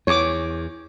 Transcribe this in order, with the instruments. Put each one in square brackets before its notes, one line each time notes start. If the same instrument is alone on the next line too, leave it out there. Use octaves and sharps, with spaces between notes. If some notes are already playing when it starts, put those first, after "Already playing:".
[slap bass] E2 [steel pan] C#5 D6